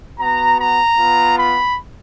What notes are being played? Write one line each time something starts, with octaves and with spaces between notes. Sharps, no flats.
B3 F#4 A#5
A#5
B3 F4
B5